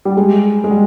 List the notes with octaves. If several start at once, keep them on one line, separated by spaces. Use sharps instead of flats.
G3
G#3
G#3
G3